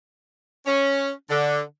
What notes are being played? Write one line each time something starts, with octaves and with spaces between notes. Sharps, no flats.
C#4
D3